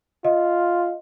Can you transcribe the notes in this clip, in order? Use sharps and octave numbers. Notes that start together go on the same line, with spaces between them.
F4 D#5